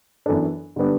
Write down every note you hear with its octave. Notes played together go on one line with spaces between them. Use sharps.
F#2 E3 B3 D4 A4
D3 G3 B3 D4